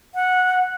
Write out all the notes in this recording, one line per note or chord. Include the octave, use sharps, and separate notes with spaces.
F#5